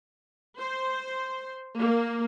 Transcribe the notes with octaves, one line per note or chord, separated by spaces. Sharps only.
C5
A#3